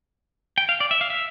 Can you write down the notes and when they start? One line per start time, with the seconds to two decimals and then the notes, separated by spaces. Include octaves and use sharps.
0.58 G5
0.69 F5
0.80 D5
0.91 E5
1.01 F5
1.10 E5